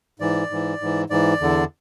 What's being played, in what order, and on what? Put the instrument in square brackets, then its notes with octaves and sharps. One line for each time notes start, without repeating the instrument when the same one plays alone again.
[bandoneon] G#2 E3 D5
G#2 E3
G#2 E3
G#2 E3 D5
E2 D3